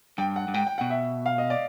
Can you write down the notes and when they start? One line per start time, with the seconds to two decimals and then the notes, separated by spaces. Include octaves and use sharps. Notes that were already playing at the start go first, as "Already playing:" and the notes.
0.18 G2 G5
0.36 F#5
0.48 G2
0.54 G#2 G5
0.67 G5
0.78 F#5
0.81 B2
0.90 E5
1.26 F5
1.38 D#5
1.50 D5